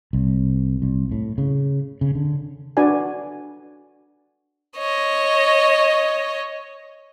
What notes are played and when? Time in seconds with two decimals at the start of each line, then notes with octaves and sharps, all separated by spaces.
0.13 C2
0.82 C2
1.12 A2
1.38 C#3
2.01 C#3
2.15 D3
2.77 D4 F#4 B4 D5 G#5
4.77 C#5 D#5